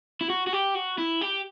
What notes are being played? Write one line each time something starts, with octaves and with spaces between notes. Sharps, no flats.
E4
F#4
F#4
G4
F#4
E4
G4